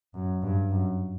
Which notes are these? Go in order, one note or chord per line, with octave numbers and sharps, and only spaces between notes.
F#2
G2
F#2